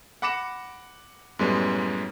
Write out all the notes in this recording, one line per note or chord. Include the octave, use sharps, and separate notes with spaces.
F#5 B5 D6 A#6 C#7 E7
F#2 A2 G3 G#3 B3